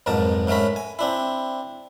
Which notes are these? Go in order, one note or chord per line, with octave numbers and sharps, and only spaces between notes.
B1 F2 G#2 A#4 A5
G#2 A3 C#4 A#4 B5
G#5
C4 D4 E4